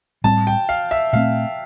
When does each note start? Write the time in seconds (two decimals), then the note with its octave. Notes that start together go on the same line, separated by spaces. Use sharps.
0.24 A2 G3 C4 A5
0.47 G5
0.69 F5
0.91 E5
1.13 A#2 A3 C4 F5